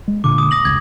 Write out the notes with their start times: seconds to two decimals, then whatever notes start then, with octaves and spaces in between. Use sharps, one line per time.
0.08 G#3
0.24 A#2 D3 D6
0.38 D#6
0.51 D#6 A#6 F#7
0.65 F1 C#2 G#6 A#6